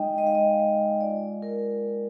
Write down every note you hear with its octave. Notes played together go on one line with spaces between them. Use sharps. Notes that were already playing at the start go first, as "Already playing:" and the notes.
Already playing: G#3 D#4 D#5 G5
G#3 D#5
F5
D#5
G#3
F4 D5
F4 A#4
A#3